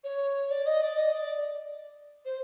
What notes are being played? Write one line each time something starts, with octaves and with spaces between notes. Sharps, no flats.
C#5
D5
D#5
D5
D#5
D5
C5